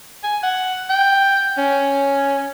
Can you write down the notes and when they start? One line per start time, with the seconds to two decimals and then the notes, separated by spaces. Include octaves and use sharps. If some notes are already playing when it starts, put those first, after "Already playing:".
0.24 G#5
0.43 F#5
0.90 G5
1.58 C#4